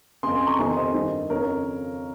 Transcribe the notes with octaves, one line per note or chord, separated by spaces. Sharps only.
F2 C#3 G#5 C6
G#5 C6
A#5 C#6
F2 C3 D#3 G#5 C6
C5 D#5
G2 D#3
F2 C#3 A#4 C#5